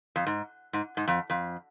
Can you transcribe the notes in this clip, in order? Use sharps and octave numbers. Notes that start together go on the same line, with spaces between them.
F2
G#2
G#2
G#2
F2
F2